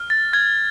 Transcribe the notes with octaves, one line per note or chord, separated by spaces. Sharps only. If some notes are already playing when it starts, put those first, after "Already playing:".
Already playing: F6
A6
F6 G#6